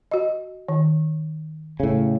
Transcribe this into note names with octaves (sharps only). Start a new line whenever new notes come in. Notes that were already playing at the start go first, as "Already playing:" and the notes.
F#4 D#5
D#3
A2 C#3